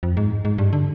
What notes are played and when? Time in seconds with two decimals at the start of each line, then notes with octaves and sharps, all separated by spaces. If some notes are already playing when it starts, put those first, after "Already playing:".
0.03 F2
0.17 G#2
0.45 G#2
0.58 G2
0.73 D3